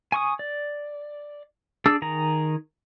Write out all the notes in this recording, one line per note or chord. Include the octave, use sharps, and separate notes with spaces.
G#5 C#6 D#6
D5
D4 G#4 A5 D6 E6
D#3 G#4 A#5